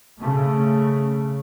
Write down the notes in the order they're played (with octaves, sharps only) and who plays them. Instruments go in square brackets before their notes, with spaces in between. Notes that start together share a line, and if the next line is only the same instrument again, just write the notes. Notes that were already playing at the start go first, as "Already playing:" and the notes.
[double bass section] C#3 A3